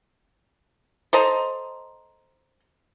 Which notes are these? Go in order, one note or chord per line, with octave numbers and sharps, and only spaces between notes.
A4 C5 D#5 A#5